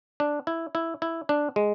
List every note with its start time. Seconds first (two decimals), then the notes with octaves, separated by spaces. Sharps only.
0.20 D4
0.47 E4
0.75 E4
1.02 E4
1.29 D4
1.56 G#3